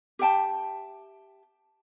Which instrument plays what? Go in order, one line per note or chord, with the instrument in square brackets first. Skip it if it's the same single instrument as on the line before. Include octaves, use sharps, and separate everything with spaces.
[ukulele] G4 E5 G5 A5